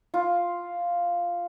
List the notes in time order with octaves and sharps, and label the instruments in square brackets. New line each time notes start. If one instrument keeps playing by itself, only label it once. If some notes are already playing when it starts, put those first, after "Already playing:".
[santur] F4